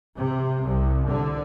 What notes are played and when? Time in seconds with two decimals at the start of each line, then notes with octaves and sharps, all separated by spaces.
0.16 C3
0.63 C2
1.08 D3